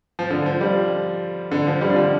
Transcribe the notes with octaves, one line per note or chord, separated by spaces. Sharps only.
F3
D3
F3
G3
D3
F3
G3
D3
F3